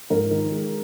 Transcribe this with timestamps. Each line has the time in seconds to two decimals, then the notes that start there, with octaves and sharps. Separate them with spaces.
0.10 G#2 A#4
0.31 D#3
0.52 G#3